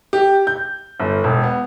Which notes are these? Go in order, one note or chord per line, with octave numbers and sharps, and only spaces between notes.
G4
G6
G1
E1
B3